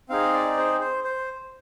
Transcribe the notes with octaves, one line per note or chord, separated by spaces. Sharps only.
C4 D#4 G#4 F5
D5
C5
C5
C5